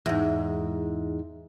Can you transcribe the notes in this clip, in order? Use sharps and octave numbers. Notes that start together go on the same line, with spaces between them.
E2 G#2